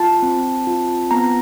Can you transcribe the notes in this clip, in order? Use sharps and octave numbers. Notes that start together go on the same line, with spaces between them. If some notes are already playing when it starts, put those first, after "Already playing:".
Already playing: F4 A5
C4
F4
B3 A#5